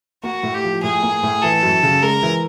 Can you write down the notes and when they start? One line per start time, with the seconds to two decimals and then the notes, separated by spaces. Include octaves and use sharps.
0.23 A#3 F#4
0.43 A2
0.54 G4
0.64 F3
0.83 A2 G#4
1.03 A#3
1.23 A2
1.42 E3 A4
1.63 F#2
1.83 C#3
2.02 G#3 A#4
2.23 E3